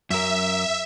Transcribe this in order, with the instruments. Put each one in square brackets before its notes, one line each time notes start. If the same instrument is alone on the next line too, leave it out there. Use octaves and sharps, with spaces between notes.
[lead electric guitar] F#2 A#4 [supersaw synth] E5